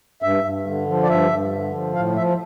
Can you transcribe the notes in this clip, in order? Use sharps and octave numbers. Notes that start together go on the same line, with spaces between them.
G2 E5
G2
D3
F3
D5
G2 E5
G2
D3
F3
A2 F5
F3 E5